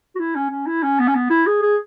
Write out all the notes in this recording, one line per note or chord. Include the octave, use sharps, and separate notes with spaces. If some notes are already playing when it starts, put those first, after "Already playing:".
F#4
E4
C#4
C#4
E4
C#4
B3
C#4
B3
E4
G#4
G#4